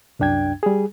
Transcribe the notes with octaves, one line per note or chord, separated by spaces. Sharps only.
C2 F#2 D4 G5 G#6
G3 G#4